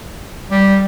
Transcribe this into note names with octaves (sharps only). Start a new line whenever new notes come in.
G3